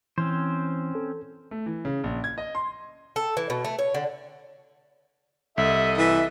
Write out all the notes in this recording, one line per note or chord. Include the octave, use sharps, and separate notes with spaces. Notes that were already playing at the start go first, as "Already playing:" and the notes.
E3 C4 C#4 C5
A4
A3
E3
C#3
A#1
G#6
D#5
C6
A4
E3
B2
A3
C#5
D3
C2 A4 D#5 E5
E3 E5